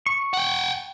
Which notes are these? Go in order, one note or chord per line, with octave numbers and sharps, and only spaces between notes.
C#6
F#5 G5